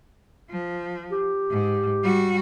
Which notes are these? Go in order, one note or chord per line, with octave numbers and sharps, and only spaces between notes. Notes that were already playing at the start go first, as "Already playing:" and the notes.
F3
G4
G#2
G3 F#4